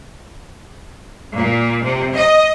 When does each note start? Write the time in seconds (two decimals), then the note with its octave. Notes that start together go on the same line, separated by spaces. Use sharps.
1.35 A#2
1.84 C3
2.17 D#5